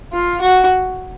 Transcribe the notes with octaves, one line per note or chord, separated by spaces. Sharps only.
F4
F#4